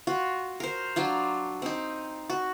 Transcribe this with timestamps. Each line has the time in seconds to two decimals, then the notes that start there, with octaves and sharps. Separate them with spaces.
0.07 F4 F#4
0.60 A#4 C5
0.96 F#3 D4 F4
1.62 C4 D#4
2.30 F#4